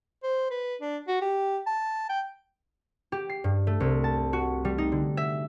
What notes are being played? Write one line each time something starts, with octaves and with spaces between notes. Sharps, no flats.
C5
B4
D4
F#4
G4
A5
G5
G4
C7
G2
A3
C2
A5
F#4
G3
D#4
D3
E5